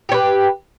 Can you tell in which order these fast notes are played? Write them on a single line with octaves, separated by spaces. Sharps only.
G4 C#5 B4